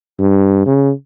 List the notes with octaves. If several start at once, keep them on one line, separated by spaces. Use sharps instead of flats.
G2
C#3